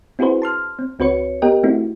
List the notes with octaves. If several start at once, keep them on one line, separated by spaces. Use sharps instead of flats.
C4 E4 F#4 G#4 B4 C5
A5 C6 F6
C4
C#2 C4 F#4 B4 C#5 C#7
B3 G4 A#4 D#5 G5
A3 C4 D#4 E4 F#4